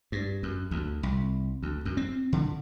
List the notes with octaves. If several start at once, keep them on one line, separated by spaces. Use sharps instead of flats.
G2
F#2
D2
C2
D2
F#2
C4
D3